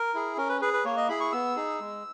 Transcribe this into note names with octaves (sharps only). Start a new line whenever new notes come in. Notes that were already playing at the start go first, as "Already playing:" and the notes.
Already playing: A#4
E4 G#4
C#4 A#4
B4
G#4 B4
B4
A#3 C#5
D#5
E4 G#4 B5
C#6
B3 E6
D#4 G#4
G#3